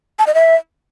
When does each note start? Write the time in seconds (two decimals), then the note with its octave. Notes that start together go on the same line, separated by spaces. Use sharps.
0.19 A5
0.27 D#5
0.35 E5